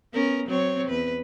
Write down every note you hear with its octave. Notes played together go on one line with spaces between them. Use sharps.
B3 C#4 A#4
F#3 C4 C#5
E2 B4